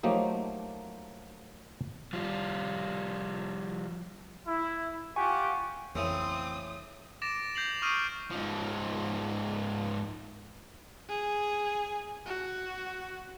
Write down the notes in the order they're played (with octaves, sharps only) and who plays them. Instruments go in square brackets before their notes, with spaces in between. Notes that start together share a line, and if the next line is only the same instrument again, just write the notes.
[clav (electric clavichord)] F3 F#3 A3 A#3 D#4 G4
[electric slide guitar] F3 G3 F4
[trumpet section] E4
[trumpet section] F4 G4 F#5 [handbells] G#5 C#6
[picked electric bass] A1 F2 A#3 [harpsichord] C#3 E3 A3 [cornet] C4 [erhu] D#6
[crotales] D6 A6 A#6 D7 E7
G6 A#6 C7 F7 F#7
C#6 D#6 F6 C7 D7 D#7
[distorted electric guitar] G#2 F3
[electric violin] G#4
F#4